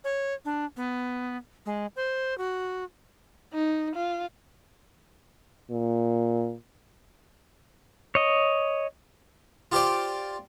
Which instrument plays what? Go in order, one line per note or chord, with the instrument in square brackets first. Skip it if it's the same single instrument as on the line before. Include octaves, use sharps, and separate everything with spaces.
[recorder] C#5
D4
B3
G#3
C5
F#4
[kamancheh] D#4
F4
[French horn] A#2
[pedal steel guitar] C#5 D#5
[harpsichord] F4 G4 C5 D5